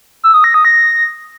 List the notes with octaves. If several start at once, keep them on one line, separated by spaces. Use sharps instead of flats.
E6
D#6
A#6
D#6
A#6